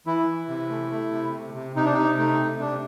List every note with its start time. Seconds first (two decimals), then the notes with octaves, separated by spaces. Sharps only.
0.06 E3 E4
0.27 E3
0.49 C3
0.69 A3
0.91 A3
1.11 C3
1.33 C3
1.54 C3
1.76 C3 D#4
1.85 D4
1.94 C3 D#4
2.18 A3 D#4
2.39 C3
2.60 C3 D4